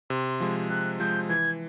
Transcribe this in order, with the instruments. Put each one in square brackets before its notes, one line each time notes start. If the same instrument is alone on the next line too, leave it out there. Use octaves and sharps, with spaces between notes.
[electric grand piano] C3 [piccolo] C6
[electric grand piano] F3 G#3
[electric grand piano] C3 [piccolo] F#6
[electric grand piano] F3 G#3 [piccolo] G6
[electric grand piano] E3 [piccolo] G#6